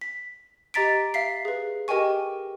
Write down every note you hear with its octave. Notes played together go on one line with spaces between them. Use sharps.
B6
G4 D#5 A#5 A6 B6 D7
E5 F5 B6 C7
G#4 B4
G4 A#4 D#5 G5 G#5 C#6